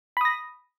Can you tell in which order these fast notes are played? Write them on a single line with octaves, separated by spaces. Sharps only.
B5 D#6 A#6